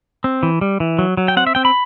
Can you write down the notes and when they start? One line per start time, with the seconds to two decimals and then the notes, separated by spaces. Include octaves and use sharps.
0.24 C4
0.43 E3
0.61 G3
0.80 E3
0.99 F#3
1.17 F#3
1.28 G5
1.37 C4 F#5
1.47 E5
1.55 C4 G5
1.65 B5